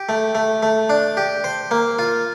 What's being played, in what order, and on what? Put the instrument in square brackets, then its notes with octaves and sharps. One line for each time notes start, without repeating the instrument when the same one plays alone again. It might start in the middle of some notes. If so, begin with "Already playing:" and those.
Already playing: [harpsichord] G4
A3
A3
A3
D4
G4
C5
A#3
F4